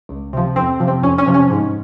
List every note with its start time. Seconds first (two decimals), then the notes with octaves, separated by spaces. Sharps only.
0.09 C#2
0.33 C3 F3
0.56 F2 C4
0.80 C3 F3
0.87 C4
1.03 F2 C#4
1.18 C#4
1.26 C3 F3
1.34 C#4
1.50 G#2